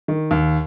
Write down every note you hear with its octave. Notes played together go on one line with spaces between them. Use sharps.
D#3
D#2